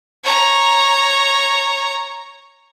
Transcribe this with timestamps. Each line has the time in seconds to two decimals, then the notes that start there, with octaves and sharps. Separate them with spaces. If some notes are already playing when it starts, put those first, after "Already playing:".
0.24 C#5 A#5